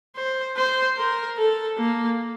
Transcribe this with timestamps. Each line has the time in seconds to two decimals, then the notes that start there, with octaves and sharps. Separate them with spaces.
0.16 C5
0.56 C5
0.97 A#4
1.37 A4
1.78 A#3